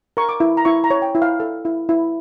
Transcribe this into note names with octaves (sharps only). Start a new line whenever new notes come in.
A#4 C#6
D6
E4
A#5
E4 C#6
A#5
C#5
G5
E4
F5
A4
E4
E4